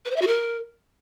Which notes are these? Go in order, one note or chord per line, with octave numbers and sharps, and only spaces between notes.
B4
C5
E5
F#4
A#4